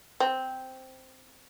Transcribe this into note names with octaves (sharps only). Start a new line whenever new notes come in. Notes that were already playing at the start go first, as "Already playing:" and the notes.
C4